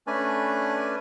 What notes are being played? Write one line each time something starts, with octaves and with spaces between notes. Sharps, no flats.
A3 C#4 D4 B4 D5 G#5